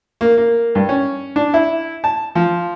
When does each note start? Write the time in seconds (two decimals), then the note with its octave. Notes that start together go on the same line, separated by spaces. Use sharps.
0.21 A#3
0.38 A#3
0.75 G2
0.89 C#4
1.36 D4
1.54 E4
2.04 A5
2.35 F3